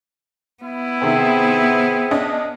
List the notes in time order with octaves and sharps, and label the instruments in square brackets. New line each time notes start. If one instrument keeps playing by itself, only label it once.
[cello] B3 [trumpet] E4
[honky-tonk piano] C3 D#3 [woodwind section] C4 G#4 E5
[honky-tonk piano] C#4 D4 D#5